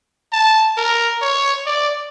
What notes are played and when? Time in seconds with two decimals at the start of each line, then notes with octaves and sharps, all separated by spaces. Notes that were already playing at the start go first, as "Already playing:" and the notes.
0.33 A5
0.77 A#4
1.22 C#5
1.66 D5